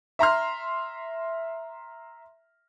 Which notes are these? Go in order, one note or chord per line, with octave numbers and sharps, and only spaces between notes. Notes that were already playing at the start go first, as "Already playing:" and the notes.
E5 A#5 C6 F6